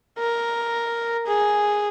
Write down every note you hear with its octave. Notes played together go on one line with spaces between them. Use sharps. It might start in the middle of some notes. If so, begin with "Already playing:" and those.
A#4
G#4